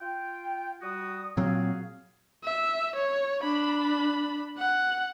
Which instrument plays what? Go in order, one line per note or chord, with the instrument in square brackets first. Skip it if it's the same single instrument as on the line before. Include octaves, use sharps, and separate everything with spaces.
[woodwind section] F4 G5
G3 F#4 D#6
[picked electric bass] A#2 F#3 C4 [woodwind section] F#4 G#4 F5
[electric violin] E5
C#5
D4 B5
F#5